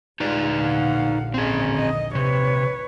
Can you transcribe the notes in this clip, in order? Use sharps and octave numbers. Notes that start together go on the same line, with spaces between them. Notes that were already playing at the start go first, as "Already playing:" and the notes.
A#1 D#2 D3 G#3 D#4 F4 B4 D5
F5 F#5
C4 C#4 G#4 D#5
D#5
C3 B4 C#5